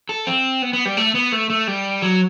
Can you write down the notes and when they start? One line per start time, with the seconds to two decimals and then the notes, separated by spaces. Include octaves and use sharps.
0.09 A4
0.27 C4
0.62 B3
0.73 B3
0.85 G3
0.97 A3
1.15 B3
1.32 A3
1.50 A3
1.67 G3
2.02 F#3